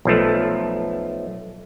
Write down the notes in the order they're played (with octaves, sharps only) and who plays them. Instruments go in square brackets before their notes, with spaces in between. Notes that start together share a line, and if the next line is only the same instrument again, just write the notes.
[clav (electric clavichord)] B1 F3 A3